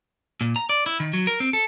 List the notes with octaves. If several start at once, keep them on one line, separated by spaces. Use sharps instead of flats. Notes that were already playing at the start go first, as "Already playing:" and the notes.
A#2
A#5
D5
E4
D#3
F#3
A#4
C4
A4